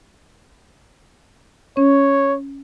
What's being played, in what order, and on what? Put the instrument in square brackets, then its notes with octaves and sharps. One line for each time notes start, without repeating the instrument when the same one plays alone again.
[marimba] C#4 [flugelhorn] C#5